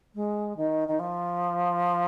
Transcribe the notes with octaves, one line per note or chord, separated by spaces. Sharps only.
G#3
D#3
D#3
F3